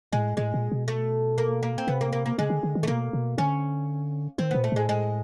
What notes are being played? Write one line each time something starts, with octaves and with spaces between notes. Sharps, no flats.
A2 G#3
A2 G#3
A#2
B2
A3
A#3
A#3
C4
C3 B3
A#3
A#3
A#3
C#3 G#3
D3
D3
D#3
A3
B2 A#3
B2
D3 C#4
D#3 C4
A#2 B3
A3
A2 G#3
G#3